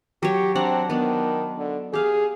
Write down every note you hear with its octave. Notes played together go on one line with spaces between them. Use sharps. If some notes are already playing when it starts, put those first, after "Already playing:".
F#3 G4 C#5
C4 D4 F#5 A#5
D#3 B3 D4
D3
G4 G#4 F5